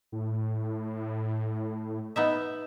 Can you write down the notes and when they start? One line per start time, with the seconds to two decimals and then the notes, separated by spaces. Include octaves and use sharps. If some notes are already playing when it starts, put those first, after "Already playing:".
0.12 A2
2.16 B3 D#4 E5